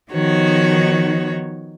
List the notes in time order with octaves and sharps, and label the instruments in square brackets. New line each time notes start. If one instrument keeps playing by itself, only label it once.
[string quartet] D#3 F3 B3 D#4 F#4 C#5